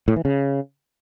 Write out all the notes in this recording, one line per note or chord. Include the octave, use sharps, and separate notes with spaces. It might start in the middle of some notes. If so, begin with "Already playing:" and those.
A2
E3
C#3